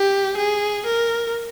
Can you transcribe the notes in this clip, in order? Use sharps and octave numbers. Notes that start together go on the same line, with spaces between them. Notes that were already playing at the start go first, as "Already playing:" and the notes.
Already playing: G4
G#4
A#4